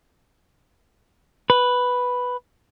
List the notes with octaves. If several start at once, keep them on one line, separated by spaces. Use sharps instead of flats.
B4